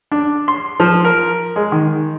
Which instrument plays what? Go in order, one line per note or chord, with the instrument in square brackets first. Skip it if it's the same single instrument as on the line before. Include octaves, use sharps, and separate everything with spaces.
[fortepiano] D4
C6
F3
A#4
G#3
D#3